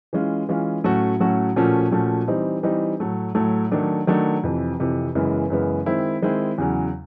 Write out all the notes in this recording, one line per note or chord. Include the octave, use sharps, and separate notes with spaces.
E3 G#3 C#4 F4
E3 G#3 C#4 F4
A2 F#3 A3 C#4 F#4
A2 F#3 A3 C#4 F#4
A#2 F3 A3 C#4 F#4
A#2 F3 A3 C#4 F#4
E3 G3 C4 D#4
E3 G3 C4 D#4
A2 F#3 A3
A2 F#3 A3
D#3 F#3 A3 D4
D#3 F#3 A3 D4
F2 C3 E3
F2 C3 E3
F#2 C#3 E3 G#3 B3
F#2 C#3 E3 G#3 B3
D#3 G#3 C4 E4
D#3 G#3 C4 E4
E2 C#3 F#3